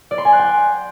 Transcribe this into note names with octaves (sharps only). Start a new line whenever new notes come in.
D5
C6
G#5
F#6
G5